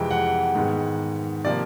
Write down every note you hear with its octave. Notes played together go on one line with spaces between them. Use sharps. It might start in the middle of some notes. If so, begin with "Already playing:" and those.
Already playing: F2 C3 E3 G#3 G5
F#5
G#2 D#3 G#3 B3
C3 F3 A#3 D5